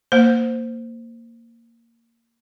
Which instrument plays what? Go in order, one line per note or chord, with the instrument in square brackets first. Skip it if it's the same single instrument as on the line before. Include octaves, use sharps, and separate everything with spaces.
[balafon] A#3 C5